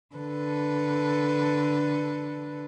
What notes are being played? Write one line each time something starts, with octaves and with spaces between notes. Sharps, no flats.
D3 A4 B4